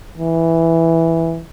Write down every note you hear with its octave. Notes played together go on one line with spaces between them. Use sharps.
E3